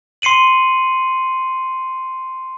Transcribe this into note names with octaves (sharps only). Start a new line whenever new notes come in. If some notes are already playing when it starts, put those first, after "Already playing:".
C6 C7 C#7 D#7 F#7